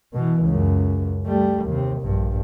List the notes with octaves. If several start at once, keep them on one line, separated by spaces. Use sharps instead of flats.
B2 E3
C#2 F#2
G3 A3
D#2 C3
A#1 G2